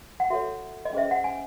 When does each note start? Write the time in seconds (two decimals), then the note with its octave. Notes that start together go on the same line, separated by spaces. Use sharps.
0.20 F#5
0.30 F#4 A4 C#5 E5
0.85 D#5
0.93 C#4 G#4 C5 E5
1.11 F#5
1.24 G#5